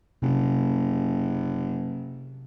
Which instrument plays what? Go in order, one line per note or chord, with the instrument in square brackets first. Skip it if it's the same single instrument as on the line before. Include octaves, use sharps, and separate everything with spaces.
[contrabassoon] F#1 [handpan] C3